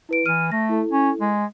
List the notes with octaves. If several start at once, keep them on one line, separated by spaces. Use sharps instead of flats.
E4 B4 D7
E3 F6 D#7
A3 A#6
E4 A4
C#4
G#3